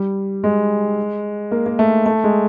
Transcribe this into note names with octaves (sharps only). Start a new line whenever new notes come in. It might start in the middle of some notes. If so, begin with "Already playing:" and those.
Already playing: G3
G#3
A#3
A#3
A3
A3
G#3